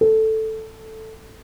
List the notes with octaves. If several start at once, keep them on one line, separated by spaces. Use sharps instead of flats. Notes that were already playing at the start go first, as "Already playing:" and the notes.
A4